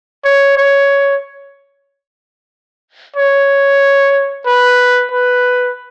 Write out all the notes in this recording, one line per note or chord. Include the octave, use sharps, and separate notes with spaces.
C#5
C#5
C#5
B4
B4